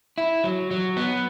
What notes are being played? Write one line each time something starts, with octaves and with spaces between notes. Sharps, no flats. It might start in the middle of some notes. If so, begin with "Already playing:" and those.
E4
F#3
F#3
B3